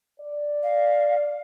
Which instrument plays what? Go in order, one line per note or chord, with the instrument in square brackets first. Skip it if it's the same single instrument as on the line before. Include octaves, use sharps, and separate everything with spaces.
[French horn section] D5
[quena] F5